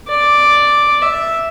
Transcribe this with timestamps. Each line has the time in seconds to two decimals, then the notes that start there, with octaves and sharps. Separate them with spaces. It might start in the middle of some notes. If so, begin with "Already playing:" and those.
0.09 D5
1.02 E5